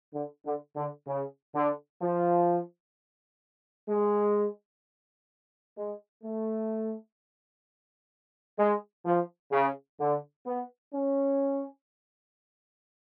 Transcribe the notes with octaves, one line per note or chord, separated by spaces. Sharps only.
D3
D3
D3
C#3
D3
F3
G#3
G#3
A3
G#3
F3
C#3
D3
B3
C#4